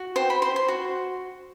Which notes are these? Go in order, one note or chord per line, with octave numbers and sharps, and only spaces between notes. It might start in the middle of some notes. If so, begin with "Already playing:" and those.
Already playing: F#4
C5 G5
B5
C5 C6
C6
F#4